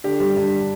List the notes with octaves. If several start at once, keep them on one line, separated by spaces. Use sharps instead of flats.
D3 G4
G3
G2